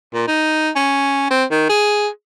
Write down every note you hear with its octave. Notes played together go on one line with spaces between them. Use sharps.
A#2
D#4
C#4
C4
D#3
G#4